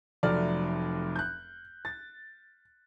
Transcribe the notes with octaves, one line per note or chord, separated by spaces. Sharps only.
F1 F2 F#3 A3 D5 F6
F#6 G6
A6